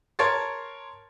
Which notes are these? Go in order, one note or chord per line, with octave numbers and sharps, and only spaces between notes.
A#4 C#5 A5 C6 A6